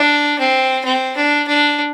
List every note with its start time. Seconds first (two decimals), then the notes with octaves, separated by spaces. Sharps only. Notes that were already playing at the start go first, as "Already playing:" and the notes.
Already playing: D4
0.39 C4
0.85 C4
1.16 D4
1.47 D4